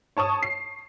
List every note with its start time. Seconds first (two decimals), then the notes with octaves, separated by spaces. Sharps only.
0.17 C#5 A5 C#6 D#6
0.42 C7